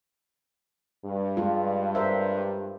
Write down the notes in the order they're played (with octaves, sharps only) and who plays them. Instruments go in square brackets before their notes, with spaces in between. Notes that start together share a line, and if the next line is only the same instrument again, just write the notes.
[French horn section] G2
[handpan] G#3 F4
A#4 C5 E5